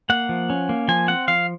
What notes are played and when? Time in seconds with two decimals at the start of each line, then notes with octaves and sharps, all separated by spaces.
0.10 A#3 F#5
0.29 F3
0.50 C#4
0.69 A#3
0.88 F3 G#5
1.08 C4 F#5
1.28 F3 F5